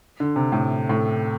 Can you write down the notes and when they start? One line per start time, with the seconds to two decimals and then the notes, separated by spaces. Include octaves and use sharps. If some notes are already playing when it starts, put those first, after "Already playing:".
0.20 D3
0.36 C3
0.52 A2
0.89 A2